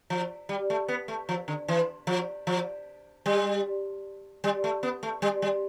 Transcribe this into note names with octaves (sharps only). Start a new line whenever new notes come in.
F3
G3
A3
B3
A3
F3
D3
E3
F3
F3
G3
G3
A3
B3
A3
G3
G3